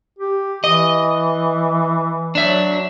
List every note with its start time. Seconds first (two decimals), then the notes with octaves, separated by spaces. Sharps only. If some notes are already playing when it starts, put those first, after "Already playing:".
0.18 G4
0.64 E3 D#5
2.35 F#3 D4 E5